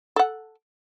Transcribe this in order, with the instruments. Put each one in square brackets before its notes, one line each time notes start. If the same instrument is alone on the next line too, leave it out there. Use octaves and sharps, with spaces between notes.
[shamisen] A4 F#5